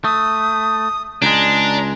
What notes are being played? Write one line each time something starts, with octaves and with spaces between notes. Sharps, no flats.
A3 D#6
C#2 G#3 D4 A#5